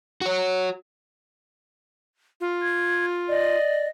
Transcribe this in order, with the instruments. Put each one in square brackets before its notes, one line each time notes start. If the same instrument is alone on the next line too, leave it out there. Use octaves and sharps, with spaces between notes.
[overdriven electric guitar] F#4 C#5
[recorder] F4
[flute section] G#6
D5 D#5